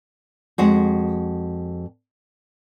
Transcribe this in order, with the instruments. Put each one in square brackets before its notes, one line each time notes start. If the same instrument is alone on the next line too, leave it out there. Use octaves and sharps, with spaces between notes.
[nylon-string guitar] F2 G#3 F#4 G#4